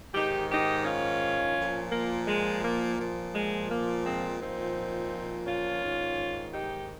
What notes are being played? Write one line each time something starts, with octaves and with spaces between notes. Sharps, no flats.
G#2 D#3 D#4 G4
D#4 G4
C#4 F4
A#2 F3
A#3
G#3
A#3
A#2 F3
G#3
A#3
G#3 C4
A#2 F3 C4 D#4
C#4 F4
G#2 D#3
D#4 G4